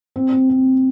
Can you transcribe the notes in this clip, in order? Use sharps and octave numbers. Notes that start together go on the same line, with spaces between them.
C4
C4
C4